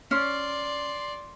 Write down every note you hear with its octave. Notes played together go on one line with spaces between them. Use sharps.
C#4 D5 C6